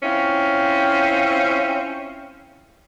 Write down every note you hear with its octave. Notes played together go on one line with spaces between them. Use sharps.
C4 C#4 E4 F4